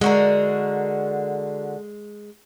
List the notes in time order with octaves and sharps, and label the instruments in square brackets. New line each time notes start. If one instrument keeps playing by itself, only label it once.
[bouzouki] D3 F#4 A#4 [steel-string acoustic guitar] G#3